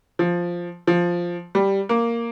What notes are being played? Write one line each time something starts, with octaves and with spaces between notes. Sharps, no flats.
F3
F3
G3
A#3